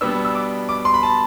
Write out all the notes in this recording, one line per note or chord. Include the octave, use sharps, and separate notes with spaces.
B2 G3 B3 D4 E6
E6
D6
D6
C6
B5
A5